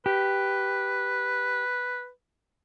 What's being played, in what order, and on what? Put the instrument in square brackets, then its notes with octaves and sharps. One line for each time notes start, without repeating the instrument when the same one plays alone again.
[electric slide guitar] G4 [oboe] B4